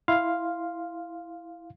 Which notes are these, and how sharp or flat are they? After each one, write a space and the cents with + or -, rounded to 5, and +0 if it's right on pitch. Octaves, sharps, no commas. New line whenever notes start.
E4 +0 F5 +0 C6 +0